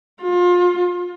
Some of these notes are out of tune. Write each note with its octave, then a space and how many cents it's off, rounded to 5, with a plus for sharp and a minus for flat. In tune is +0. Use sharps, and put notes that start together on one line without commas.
F4 +30